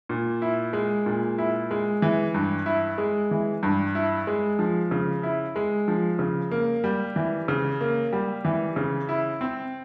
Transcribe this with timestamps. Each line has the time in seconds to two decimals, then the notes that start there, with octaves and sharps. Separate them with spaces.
0.09 A#2
0.42 E4
0.73 G#3
1.06 A#2
1.38 E4
1.71 G#3
2.02 E3
2.34 G2
2.66 E4
2.98 G#3
3.31 E3
3.63 G2
3.95 E4
4.27 G#3
4.59 F3
4.91 C#3
5.23 E4
5.56 G#3
5.88 F3
6.19 C#3
6.51 A#3
6.84 G3
7.16 E3
7.48 C#3
7.81 A#3
8.13 G3
8.45 E3
8.76 C#3
9.09 E4
9.41 C4